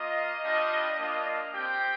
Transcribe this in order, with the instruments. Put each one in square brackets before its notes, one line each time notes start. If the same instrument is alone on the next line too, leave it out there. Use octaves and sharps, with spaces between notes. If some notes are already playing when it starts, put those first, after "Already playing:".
Already playing: [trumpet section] A#3 F4 D#5
G3 D4 F4
A#3 D4 F4
C4 G4 G5